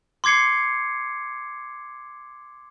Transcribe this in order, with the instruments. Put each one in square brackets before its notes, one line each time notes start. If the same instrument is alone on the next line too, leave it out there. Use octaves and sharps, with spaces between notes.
[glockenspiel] C6 D6 G#6 C7 C#7